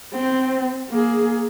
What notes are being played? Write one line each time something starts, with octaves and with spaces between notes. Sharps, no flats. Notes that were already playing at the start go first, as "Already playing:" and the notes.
C4
A#3 G#4